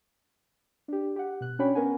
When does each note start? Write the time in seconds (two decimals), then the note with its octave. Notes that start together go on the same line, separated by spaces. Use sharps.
0.88 D4 G4
1.16 G4 F#5
1.41 B2 F#6
1.59 C#4 D4 F#4 C#5 G5 B5
1.75 B3 C#4 A#4 B4 F#5 G#5